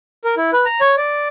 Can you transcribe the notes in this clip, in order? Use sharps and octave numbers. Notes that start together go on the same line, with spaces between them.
A#4
E4
B4
A#5
C#5
D5